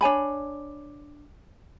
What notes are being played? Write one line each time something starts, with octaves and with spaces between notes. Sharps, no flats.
D4 C#5 G#5 B5